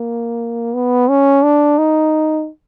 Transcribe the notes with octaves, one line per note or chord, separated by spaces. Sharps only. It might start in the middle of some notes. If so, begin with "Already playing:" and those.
Already playing: A#3
B3
C#4
D4
D#4